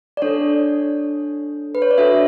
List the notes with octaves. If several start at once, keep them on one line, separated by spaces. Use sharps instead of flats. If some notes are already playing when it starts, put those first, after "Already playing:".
D5
D4 A4 C#5
B4
C#5
D5
D4 F#4 A4 C#5 E5